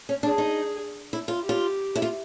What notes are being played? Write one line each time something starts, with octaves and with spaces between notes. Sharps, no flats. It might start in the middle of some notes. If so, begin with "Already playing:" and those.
C#4
D4 G#4
D#4
E4
F4
G4
F4
E4
F4